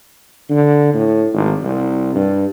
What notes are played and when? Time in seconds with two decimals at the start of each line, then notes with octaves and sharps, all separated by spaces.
0.49 D3
0.94 A2
1.34 G#1
1.63 C2
2.15 G2